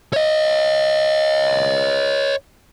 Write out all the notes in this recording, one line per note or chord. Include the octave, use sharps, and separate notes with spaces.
C#5 D#5